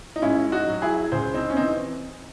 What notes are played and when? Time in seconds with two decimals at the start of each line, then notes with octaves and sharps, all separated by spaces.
0.16 D#4
0.22 G#2 C#4 E4
0.52 D#4 F#4
0.67 F#3
0.82 E4 G#4
1.12 C#2 G#4 C5
1.34 C4 D#4
1.50 C#4
1.56 C3 E3 C4 D#4